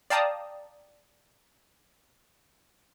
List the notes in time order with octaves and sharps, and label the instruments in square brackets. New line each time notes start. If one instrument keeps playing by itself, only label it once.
[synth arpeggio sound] D5 F5 G5 A5 A#5 D#6